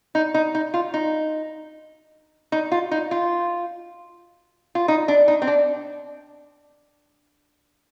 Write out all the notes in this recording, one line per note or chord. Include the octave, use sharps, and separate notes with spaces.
D#4
D#4
D#4
F4
D#4
D#4
F4
D#4
F4
F4
D#4
D4
D#4
C4
D4